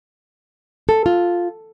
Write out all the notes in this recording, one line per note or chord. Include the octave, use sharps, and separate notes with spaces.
A4
F4